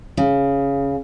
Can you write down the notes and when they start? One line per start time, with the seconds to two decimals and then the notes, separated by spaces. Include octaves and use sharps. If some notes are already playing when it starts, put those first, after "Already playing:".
0.17 C#3